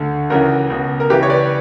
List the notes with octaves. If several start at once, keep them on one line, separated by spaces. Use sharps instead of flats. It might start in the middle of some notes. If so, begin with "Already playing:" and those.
Already playing: D2 D3
C#2 C#3 E3 F#4 A#4
C#2 B2
A#4
C#2 C#3 E3 G4 B4
C#5
B4 D5